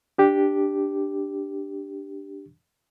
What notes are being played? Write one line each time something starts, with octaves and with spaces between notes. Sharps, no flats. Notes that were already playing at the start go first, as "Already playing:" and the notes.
D4 G4